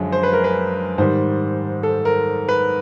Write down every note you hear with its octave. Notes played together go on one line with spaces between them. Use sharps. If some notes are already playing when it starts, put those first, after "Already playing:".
Already playing: F#2 D3 F3 G#3
C5
B4
A#4
B4
G#2 D#3 G3 C5
A4
A#4
B4